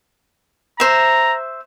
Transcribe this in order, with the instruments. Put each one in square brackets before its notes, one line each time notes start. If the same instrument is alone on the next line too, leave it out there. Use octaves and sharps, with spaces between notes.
[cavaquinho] C5 E5 [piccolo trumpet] A#5